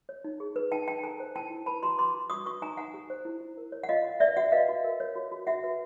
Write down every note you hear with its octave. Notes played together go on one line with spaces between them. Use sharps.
C#5
D#4
G#4
B4
D#4 G5 A5
D#4 G5 A5
A4 G#5 A#5
C5
E4 G5 A5
E4
B4 A5 B5
F#4 A#5 C6
B4 C6 D6
F#4
F#4 C#6 D#6
B4 C#6 D#6
D#4 G#5 A#5
D#4 F#5 G#5
G4
C5
E4
E4
A#4
C#5
F#5
F4 D#5 F5
F4
B4 D5 E5
F#4 E5 F#5
B4 D#5 F5
F#4
A#4
C#5
F#4
F#4
F#4 E5 F#5
B4